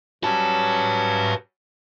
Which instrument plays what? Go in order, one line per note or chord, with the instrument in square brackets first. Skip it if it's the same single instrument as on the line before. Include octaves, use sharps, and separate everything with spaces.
[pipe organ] F#3 G3 C#4 [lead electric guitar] B4 A5